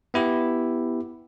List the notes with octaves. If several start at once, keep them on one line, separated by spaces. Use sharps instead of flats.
B3 E4 G4